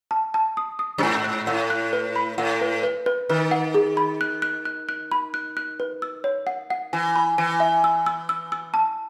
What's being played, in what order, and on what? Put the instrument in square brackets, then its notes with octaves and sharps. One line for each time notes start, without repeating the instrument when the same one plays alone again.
[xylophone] A5
A5
D#6
D#6
[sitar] F#2
[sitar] G#2 [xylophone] G#5
[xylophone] F#6
[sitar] A2 [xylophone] F#5
[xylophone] F#6
B4
B5
[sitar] A2 [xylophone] F#5
[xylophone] B4
B4
B4
[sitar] D#3 [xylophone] B4
[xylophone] F#5
G#4
B5
F#6
F#6
F#6
F#6
B5
F#6
F#6
B4
E6
C#5
F#5
F#5
[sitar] E3 [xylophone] G#5
[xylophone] B5
[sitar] E3 [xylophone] G#5
[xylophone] E5
E6
E6
E6
E6
A5